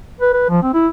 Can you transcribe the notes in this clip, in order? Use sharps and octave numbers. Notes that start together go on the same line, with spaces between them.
B4
B4
F3
C4
E4